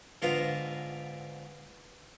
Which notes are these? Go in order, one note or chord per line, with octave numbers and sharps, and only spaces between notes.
G#2 D3 B3 F4 A#5